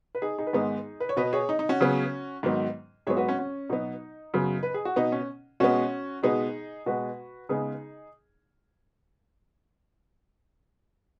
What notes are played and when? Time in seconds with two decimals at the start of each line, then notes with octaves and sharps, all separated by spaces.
0.15 B4
0.22 D#4 G#4
0.38 D#4 G#4
0.47 B4
0.53 G#2 D#3 G#3 B3 D#4 G#4
1.00 B4
1.09 C#5
1.16 B2 B3 B4 D#5
1.33 G#4 C#5
1.49 D#4
1.59 D#4
1.69 C#4 F#4
1.81 C#3 F#3 B3
2.43 G#2 D#3 F#3 B3
3.07 G#2 F#3 B3 G#4 C#5
3.17 F#4 B4
3.28 C#4 F#4
3.39 C#4
3.70 B2 F#3 B3 D#4
4.34 F#2 C#3 F#3 B3
4.63 B4
4.74 G#4
4.85 F#4
4.96 B2 B3 D#4
5.12 C#4
5.60 B2 G#3 B3 C#4 F#4
6.23 B2 G#3 B3 D#4 G#4
6.86 B2 G#3 B3 F#4 B4
7.49 C#3 G#3 B3 D#4 G#4